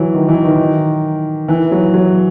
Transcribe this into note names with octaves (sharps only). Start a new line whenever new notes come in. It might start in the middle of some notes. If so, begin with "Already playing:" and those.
Already playing: E3 F#3
D#3
E3
D#3
E3
F#3
F#3